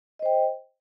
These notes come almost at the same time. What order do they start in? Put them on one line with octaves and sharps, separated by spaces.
D#5 C5 G5